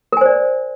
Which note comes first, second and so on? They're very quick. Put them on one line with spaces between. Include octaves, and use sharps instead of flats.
A#4 G#5 C5 D5